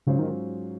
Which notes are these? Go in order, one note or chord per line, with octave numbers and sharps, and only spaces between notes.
G#2 C#3 F#3 C#4 F4 C5
D#3